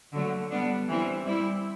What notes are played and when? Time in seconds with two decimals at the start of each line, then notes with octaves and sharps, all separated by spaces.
0.12 D3 F#3 A3
0.50 G3 B3 D4
0.89 E3 G3 C4 E4
1.26 G3 C4 E4